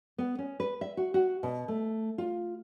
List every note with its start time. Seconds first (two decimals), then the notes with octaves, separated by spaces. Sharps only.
0.18 B3
0.39 C#4
0.60 B4
0.81 E5
0.97 F#4
1.14 F#4
1.43 B2
1.68 A3
2.18 F4